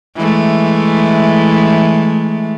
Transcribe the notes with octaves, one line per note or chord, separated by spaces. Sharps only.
E3 G#3 A3